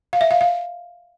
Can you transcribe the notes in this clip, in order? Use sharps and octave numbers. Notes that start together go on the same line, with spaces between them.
F5
E5
F5
F5